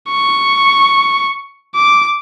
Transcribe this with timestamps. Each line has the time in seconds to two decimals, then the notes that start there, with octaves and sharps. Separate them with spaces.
0.11 C#6
1.76 D6